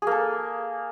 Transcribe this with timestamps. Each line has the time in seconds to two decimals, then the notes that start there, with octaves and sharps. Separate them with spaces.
0.02 G#4
0.07 A#3
0.12 A4